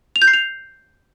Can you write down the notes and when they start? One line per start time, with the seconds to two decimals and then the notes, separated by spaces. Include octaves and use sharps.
0.16 F7
0.22 G6
0.28 C7
0.33 F7